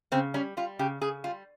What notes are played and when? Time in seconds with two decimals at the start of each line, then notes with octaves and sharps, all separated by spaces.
0.12 C#3 C4
0.34 G3 C#4
0.57 G3 F4
0.79 C#3 G4
1.01 C#3 G#4
1.24 G3 F4